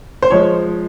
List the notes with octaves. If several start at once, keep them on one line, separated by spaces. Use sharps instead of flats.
C5
F3 G#3 C#5